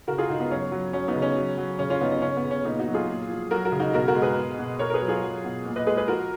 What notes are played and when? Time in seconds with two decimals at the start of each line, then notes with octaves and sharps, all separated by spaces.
0.08 C#3 F#4 A#4
0.18 F4 G#4
0.30 C#3 D#4 F#4
0.40 B3
0.51 F#3 C#4
0.72 F#3
0.93 F#3 C#4
1.08 B3 D#4
1.16 C#3
1.22 C#4
1.37 F#3
1.57 F#3
1.79 C#3 C#4
1.90 C#4 F4
2.01 C#3 B3 D#4
2.11 C#4
2.22 C#3 C#4
2.37 B3
2.44 C#3
2.51 C#4
2.65 A#2 B3 D#4
2.79 D#4 F#4
2.87 F#3
2.94 F4 G#4
3.08 A#2
3.29 F3
3.51 F#3 F#4 A#4
3.65 F#4 A#4
3.72 C#3
3.79 D#4 F#4
3.93 B2 F#4 A#4
4.08 F#4 A#4
4.15 G#3
4.22 G#4 B4
4.36 B2
4.59 B2
4.79 B2 A#4 C#5
4.90 A#4
4.94 G#4 B4
5.02 F#3
5.08 F4 G#4
5.22 F#3
5.45 B2
5.65 A#2
5.76 B4 D#5
5.87 G#3 G#4 B4
5.97 G#4 B4
6.08 F3 F#4 A#4